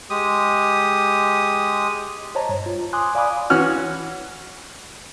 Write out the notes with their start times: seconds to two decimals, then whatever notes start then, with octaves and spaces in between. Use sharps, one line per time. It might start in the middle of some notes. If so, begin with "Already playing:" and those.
0.10 G#3 G4 D#6
2.35 C5 C#5 D#5 A5 A#5
2.49 G2
2.66 F4
2.93 G#5 C6 D6 D#6 F#6
3.15 D5 F5 G#5 B5 D6 D#6
3.50 E3 C#4 F#4 F6 F#6